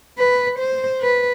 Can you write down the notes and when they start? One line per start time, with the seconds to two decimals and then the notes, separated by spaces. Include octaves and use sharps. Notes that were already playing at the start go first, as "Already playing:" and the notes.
0.18 B4
0.59 C5
1.01 B4